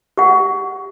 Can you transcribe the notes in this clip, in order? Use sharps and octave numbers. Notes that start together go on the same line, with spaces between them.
G4 F#5